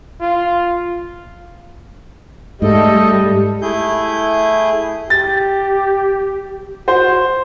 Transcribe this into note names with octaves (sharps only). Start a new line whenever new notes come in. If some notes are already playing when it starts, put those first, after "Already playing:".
F4
G#2 G3 A3 A4 D#5
A3 E4 G#4 G6
G4 A6
F#4 C5